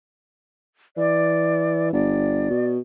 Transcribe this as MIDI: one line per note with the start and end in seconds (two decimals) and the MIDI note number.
0.97 1.92 52
0.97 1.93 74
1.93 2.49 31
1.93 2.69 74
2.50 2.79 47